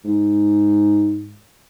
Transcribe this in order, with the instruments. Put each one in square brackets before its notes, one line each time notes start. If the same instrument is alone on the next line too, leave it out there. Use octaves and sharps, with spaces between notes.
[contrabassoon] G#2